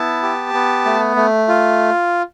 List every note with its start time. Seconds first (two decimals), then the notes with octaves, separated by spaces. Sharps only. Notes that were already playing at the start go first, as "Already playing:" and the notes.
Already playing: B3 E4 A5
0.23 G4
0.54 B3
0.85 A3
1.16 A3
1.48 F4